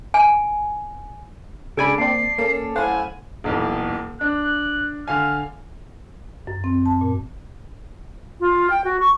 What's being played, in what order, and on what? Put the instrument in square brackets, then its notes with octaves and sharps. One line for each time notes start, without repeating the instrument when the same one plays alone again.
[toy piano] G#5
[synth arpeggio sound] C#3 G#5 B5 [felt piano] G#3 D4 A4 [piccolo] D7
[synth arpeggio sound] A#3 C4 [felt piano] D5 A5 [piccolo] C7
[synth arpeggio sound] A#3 [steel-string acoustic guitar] C#4 A4
[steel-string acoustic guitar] F#2 A3 E4 [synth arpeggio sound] C5 F5 F#5 [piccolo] G#5
[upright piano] D#1 B1 E2
[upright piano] D4 [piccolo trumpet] F#6
[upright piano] D3 F5 G#5 [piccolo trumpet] F6
[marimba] F#2
C4
A5
A#2
[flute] F4
G5
F#4
C#6